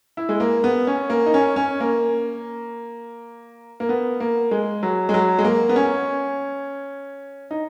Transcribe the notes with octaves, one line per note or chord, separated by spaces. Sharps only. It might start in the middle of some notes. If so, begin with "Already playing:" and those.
E4
G#3
A#3
B3
C#4
A#3
D#4
C#4
C#4
A#3
A#3
B3
A#3
G#3
F#3
G#3
F#3
G#3
A#3
B3
C#4
D#4